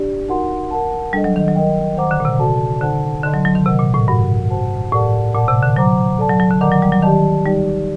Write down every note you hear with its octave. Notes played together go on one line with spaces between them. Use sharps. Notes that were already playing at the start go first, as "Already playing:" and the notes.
Already playing: D4 G4 D5
D#4 F#4 A#4 F#5 C6
A#4 F#5 A5
G3 D4 A4 D#5
F#3
D#3
F#3
A#4 D#5 G5
D#3 C5 F#5 A#5 D6
D3
A#2
C3
F#4 A4 D5 A5
D3 D#4 A4 C5 F#5 A5
D3 D#4 A4 D#5 A5 C6
F#3
F#3
D#3
C3 A#4 D#5 F#5
A#2
A2
G2 F#4 A#4 F#5
F#4 C5 F#5 A5
A2 G4 A#4 D5 F#5 A5
A#2 A#4 D5 F#5 A5 D6
C3
D3
F#3 C5 F#5 A#5 D6
A4 D5 A5
F#3
F#3
D3
D#3 A#4 D5 F#5 A#5 D6
F#3
G3
F#3
D#3 G4 D5 A5
G3 D#4 G4 D5